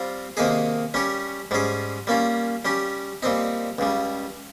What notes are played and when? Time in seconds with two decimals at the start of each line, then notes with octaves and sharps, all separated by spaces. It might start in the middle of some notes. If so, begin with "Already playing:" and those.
Already playing: G3 C4 F4
0.37 C3 D#3 A#3 D#4 G#4
0.94 G3 C#4 G4 C#5
1.51 G#2 G3 C#4 G#4
2.07 G3 A#3 C#4 F4
2.65 G3 C#4 G4
3.23 A#2 G3 C4 D#4
3.78 C#2 C#3 G3